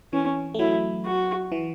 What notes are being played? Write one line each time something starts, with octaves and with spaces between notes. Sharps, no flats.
E3 C#4
A3
F#3 E4
F#4
E3